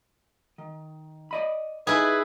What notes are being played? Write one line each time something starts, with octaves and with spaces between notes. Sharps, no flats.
D#3
D5 D#5 B5
D#4 E4 G#4 B4